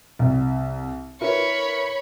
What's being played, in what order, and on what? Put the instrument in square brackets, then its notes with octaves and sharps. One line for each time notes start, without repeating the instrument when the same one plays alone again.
[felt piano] C2
[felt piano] E4 A#4 B4 [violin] C#5 B5